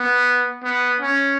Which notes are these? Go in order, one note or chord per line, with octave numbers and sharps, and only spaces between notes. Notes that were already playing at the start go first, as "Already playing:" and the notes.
Already playing: B3
B3
C#4